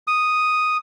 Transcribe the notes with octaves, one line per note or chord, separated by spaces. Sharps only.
D#6